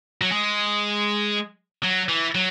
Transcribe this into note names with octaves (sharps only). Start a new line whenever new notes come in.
F#3
G#3
F#3
E3
F#3